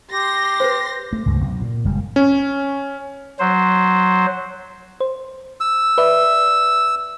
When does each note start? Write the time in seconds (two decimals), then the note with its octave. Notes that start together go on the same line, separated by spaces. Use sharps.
0.12 G4 C6 A#6
0.60 B4 C5
1.13 A3
1.26 C#2 G2 A3
1.41 B1
1.62 A#2
1.85 F#1 G3 G#3
2.16 C#4
3.39 F#3 C5
5.00 C5
5.61 E6
5.98 B4 D5 E5